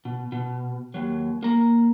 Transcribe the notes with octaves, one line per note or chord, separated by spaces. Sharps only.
B2
B2
D#2 F#3
A#3 A#5